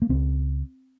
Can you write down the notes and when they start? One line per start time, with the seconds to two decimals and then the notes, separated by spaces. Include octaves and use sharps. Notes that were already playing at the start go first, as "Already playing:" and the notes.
0.02 A#3
0.09 C#2 C#3 C4